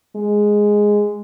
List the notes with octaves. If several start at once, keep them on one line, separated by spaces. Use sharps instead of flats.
G#3